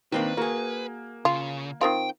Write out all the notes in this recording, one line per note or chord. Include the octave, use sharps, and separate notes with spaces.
D#3 A#3 C4 D4 B4
A#3 F#4 G#4
C#3 F4
D#3 C4 F4 G5